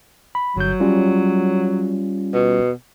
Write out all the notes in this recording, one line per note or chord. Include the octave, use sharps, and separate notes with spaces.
B5
G1 F#3 G6
G3 C#4 F4
B2